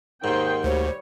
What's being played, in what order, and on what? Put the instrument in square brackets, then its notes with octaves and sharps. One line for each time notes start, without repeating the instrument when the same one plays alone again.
[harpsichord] D#2 G#2 [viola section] D#3 C5 G5
[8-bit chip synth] D2 [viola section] G3 C#5 [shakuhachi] C5